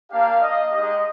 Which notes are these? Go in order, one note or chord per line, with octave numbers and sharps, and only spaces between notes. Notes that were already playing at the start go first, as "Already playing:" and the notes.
A#3 D4 G4 F5
D#5
G#3 D#4 G4 D#5